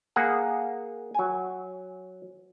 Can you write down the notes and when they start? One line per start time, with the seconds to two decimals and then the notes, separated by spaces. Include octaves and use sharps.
0.16 A#3 G#4 F#5
1.15 F#3 G#5